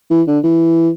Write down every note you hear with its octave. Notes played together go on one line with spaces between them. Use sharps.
E3
D3
E3